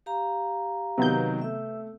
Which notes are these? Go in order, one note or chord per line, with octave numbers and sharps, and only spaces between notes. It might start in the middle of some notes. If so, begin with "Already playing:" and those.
G4 F5 A#5
C3 D#3 F#3 B3 G6
A3 E5 E6